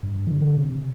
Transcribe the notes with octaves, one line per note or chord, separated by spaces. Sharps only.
G2
E3
D3
C3